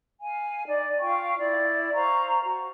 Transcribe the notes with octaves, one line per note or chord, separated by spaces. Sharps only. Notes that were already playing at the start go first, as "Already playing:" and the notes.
F5 G#5
D#4 D5
F4 F5 G5 C#6
E4 D5
C5 F5 A#5 C#6
F#4